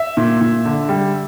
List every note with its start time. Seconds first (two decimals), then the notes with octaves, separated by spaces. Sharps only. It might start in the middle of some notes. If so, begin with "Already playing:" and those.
Already playing: E5
0.17 A#2
0.41 A#2
0.65 D3
0.89 G3